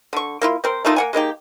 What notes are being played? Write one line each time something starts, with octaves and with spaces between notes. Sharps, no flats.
D3 C#6
A#3 E4 F4
C4 A#4 C5
A3 A#3 D#4 F4
A#3 F#5 G#5
G#3 A#3 D#4 G4